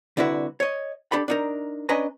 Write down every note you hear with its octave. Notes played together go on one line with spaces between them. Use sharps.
C2 D3 E4 F#4 B4
C#5 D#5
D4 G4 A4 B5
D4 D#4 A#4
C#4 D4 B4 D#5 G#5 A#5